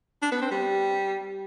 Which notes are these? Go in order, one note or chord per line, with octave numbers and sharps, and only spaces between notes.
D4
B3
C4
G3